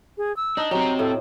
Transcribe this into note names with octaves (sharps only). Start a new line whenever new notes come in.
G#4
E6
D4 D#4
F#3 C4 G4 A#5
A2 A4